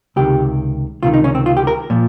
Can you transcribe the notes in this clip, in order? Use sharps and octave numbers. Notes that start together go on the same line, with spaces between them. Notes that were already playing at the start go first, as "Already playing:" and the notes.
C#2 C3 D#3 G4
C#2 C3 D#3 F4
D#4
C#4
C4
F4
G4
A#4
A#2 F3